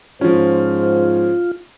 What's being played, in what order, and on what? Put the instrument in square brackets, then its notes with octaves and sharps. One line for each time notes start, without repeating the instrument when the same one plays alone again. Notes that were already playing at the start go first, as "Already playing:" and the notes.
[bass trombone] G#2 [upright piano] F3 C#4 [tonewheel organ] F4 [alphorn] C5